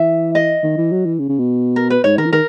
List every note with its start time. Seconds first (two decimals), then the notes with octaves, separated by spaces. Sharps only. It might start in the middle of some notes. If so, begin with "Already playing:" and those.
Already playing: E3 E5
0.35 D#5
0.63 D#3
0.77 E3
0.92 F#3
1.05 E3
1.19 C#3
1.29 C#3
1.39 B2
1.76 A#4
1.90 B4
2.04 G#2 C#5
2.18 D#3 A#4
2.25 E3
2.32 D#3 A#4